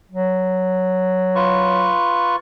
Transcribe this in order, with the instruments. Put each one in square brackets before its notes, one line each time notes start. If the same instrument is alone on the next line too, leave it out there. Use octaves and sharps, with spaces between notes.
[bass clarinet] F#3
[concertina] F4 B4 C#6